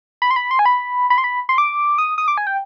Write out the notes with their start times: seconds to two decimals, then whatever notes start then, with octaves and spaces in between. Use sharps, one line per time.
0.22 B5
0.31 C6
0.36 B5
0.51 C6
0.59 G#5
0.66 B5
1.10 B5
1.18 C6
1.24 B5
1.49 C6
1.58 D6
1.98 D#6
2.18 D#6
2.28 D6
2.38 G#5
2.47 G5